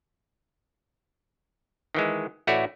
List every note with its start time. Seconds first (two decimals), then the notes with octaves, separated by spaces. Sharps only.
1.95 D#3 E3 G#3
2.47 A1 A3 E4 F#4 C#5 D5